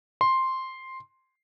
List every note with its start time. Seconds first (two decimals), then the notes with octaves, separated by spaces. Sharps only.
0.21 C6